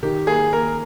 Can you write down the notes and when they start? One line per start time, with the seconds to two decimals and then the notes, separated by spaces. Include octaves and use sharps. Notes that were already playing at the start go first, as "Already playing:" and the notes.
0.03 D#3 G4
0.27 A#3 G#4
0.53 A#3 A#4